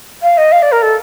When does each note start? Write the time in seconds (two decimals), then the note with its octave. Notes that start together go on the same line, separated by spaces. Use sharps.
0.23 F5
0.38 D#5
0.52 F5
0.62 D5
0.72 A#4
0.82 A4